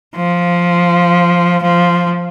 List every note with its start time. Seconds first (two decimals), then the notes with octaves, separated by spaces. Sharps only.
0.16 F3
1.63 F3